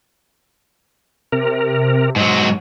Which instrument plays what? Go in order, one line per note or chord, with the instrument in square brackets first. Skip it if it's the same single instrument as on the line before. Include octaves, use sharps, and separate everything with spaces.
[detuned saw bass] C3 [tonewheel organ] A#4
[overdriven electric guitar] G#2 F#3